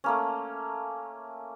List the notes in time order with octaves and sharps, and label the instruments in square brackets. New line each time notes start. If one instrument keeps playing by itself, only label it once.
[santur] A3 A#3 C#4